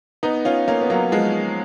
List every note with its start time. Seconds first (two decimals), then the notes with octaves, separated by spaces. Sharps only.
0.23 B3 D#4
0.45 C#4 F4
0.68 A#3 C#4
0.81 B3
0.90 F#3 A#3
1.12 F3 G#3